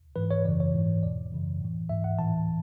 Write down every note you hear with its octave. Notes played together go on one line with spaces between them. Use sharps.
G#2 E3 B4
C#5
F#2 C#3 E3 D5
C#5
G#2 E3
E2 B2 D5
F#2 C#3 E3
A2 E3
G#2 E3 E5
F#5
A2 E3 A5